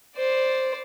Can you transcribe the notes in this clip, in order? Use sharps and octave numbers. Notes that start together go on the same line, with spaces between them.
C5 D5